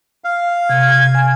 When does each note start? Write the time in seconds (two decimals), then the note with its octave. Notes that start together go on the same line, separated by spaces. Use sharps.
0.24 F5
0.70 C3 G#6
1.15 G#5